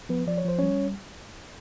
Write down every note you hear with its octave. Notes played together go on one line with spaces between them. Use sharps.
F3 B3 B4
F3 D5
C#5
F3 C5
G3 C#4 C#5